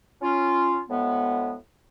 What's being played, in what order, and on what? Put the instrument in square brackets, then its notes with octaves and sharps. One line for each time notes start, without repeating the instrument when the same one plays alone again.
[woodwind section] C#4 F4
D2 A2 G#3 B3